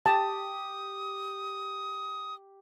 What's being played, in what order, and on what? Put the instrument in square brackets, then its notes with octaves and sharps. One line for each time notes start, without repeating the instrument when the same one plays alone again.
[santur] G4 [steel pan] A5 [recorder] D#6